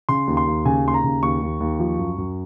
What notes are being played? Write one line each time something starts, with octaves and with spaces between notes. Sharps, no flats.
C#3 C6
D#2
C6
D#2
C#3 G#5
D#2 C6
A#5
C#3
D#2 C#6
D#2
D#2
F3
F#2
F#2